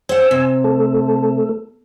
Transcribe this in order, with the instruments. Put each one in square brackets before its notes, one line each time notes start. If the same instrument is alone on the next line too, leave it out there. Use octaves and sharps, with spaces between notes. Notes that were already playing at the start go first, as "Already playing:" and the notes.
[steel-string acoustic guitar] C5 F#5 [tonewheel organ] G#5 E6
[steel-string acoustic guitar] C3
[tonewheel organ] A3 A4